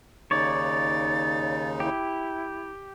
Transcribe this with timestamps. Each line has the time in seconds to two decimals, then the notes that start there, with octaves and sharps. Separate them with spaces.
0.31 D#2 C#3 D#4 C#5 D5 A6
1.80 E4 G4